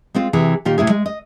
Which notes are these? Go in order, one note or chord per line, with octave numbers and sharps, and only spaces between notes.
G#3 C4 F4
C3 E3 G#4
A#2 D#3 F4 G4
A2 C3 E4 G#4
G#3
D#5